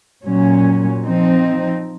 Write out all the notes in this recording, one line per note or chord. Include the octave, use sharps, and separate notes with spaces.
A#2 F#3 C#4
F3 C4 D#4